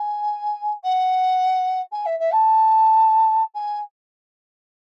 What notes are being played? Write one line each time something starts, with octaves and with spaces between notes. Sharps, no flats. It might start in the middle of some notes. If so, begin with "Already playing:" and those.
Already playing: G#5
F#5
G#5
E5
E5
A5
G#5